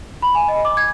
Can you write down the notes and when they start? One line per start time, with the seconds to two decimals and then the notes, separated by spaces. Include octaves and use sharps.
0.22 B5
0.35 G#5
0.48 D#5
0.65 D6
0.77 G#6